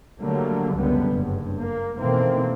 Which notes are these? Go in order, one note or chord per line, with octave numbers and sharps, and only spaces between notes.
D3 F#3 G3 A3 A#3
C#2 F#2 D3 G3 B3
F#1 G2
A#3
B2 D#3 E3 A3 A#3 C4